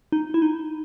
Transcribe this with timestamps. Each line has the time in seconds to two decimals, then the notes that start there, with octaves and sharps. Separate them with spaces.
0.12 D#4
0.34 E4
0.42 D#4